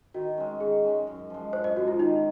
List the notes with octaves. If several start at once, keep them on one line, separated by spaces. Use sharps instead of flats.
D#3 F#4
G#3 C#4
D#3 G#4
G#3 C#4
F#2
F3 G#3
F#2 C5
D#5
F3 G#3 F#4
F4
D#3 D#4